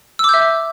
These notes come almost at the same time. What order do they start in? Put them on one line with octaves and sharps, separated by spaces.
E6 D6 G6 E5